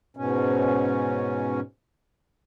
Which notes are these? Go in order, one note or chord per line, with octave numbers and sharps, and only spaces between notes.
G#2 B2 C#4